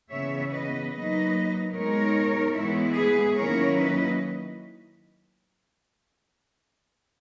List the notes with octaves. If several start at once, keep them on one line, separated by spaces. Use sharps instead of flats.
C#3 E3 B3 C#5 E5
B4 D#5
F#3 A#3 D#4 B4 D#5
B2 G#3 D#4 A#4 C#5
E3 G#3 B3 E4
G#4 B4
D#3 F#3 A#3 C#4 E4 A#4 C#5
B4 D#5